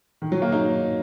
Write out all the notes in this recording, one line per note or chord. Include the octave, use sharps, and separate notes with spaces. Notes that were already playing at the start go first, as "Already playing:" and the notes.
D#3
F#3
A#3
D#4